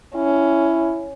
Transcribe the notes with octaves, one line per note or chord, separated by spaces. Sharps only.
C#4 E4